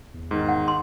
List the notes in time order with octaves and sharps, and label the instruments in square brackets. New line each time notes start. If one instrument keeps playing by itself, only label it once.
[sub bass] E2
[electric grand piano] G#2 D#3
[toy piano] F#5
C6